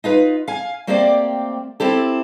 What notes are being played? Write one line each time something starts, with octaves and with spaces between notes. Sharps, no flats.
D#4 F4 B4
F5 G#5
A3 A#3 C4 G4 C5 D5
C4 E4 G4 A4